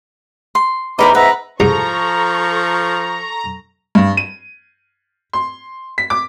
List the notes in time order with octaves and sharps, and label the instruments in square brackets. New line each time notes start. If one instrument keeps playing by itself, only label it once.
[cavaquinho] C6
[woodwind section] E2 D6 [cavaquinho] D#4 A#4 C5 [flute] B5
[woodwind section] G#2 B3 E5 [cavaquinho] B4 [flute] A#5
[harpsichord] C2 G#2 [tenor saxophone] F3 [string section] A4 C#6 [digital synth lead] A#5
[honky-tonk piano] G2
D#7
C6
B6
D6